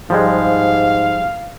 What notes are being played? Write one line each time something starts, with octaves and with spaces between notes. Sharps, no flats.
G#2 F3 G3 G#3 F5